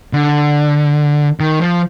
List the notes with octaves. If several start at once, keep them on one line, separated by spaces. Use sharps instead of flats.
D3
D#3
F3